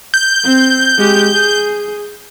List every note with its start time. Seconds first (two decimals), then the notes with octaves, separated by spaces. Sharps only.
0.14 G6
0.43 C4
0.98 G#3 G4
1.32 G#4